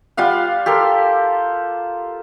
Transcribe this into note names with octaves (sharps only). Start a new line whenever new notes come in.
G3 F4 F5 F#5
G4 A4 A#4 C6